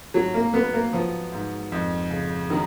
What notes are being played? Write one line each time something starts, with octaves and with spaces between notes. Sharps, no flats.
G#2 F#3
A#3
F#3 B3
A#3
F3 B3
G#2
F2
C#3
D#3 F#3